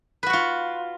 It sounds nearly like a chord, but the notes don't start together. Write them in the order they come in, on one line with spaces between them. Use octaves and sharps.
B4 F#4 F#5 F4